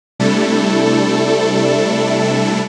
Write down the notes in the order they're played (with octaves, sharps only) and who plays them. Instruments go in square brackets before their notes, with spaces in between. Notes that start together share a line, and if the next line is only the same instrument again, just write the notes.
[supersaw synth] C3 G3 A3 D4 E4 A4